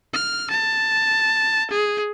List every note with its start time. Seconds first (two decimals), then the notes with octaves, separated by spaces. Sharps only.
0.14 F6
0.50 A5
1.70 G#4